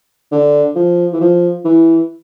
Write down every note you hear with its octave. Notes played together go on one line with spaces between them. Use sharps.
D3
F3
E3
F3
E3